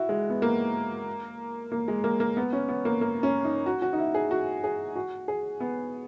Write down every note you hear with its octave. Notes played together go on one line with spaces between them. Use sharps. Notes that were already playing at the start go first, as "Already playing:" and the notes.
Already playing: E4 F#4
G#3
B3
A#3
A#3
G#3
A#3
A#3
B3
C#4
B3
A#3
A#3
C#4
D#4
F#4
F#4
D#4
E4
G#4
F#4
G#4
F#4
G#4
B3